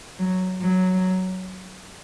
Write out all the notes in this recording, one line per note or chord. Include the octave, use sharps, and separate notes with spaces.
F#3
F#3